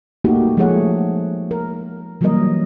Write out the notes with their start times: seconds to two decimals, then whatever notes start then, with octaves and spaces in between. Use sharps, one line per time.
0.24 A3 A#3 D#4 F#4 G4
0.57 F3 G#3 A3 G#4 C#5 F#5
1.51 A#4
2.21 E3 F#3 G3 A#3 A#4 D#5